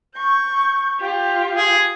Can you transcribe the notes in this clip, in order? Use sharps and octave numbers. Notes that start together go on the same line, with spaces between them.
C#6 G6
F4 G4
G#4